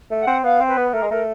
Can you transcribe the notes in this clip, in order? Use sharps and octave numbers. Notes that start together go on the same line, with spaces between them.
A3
F#5
C4
B3 F5
C4
B4
B3
A3 A#4
G#3
A3 A#4